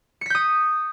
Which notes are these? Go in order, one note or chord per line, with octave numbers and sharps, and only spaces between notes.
D#6 G6 B6 C#7